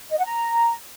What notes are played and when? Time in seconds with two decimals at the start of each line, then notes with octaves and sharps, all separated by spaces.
0.11 D#5
0.18 F#5
0.25 A#5